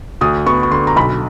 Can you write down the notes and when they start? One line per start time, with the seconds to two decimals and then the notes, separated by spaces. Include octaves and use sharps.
0.21 D2 D#6
0.46 B3 C#6
0.63 C#6
0.71 D3 C6
0.87 A#5
0.96 B1 B5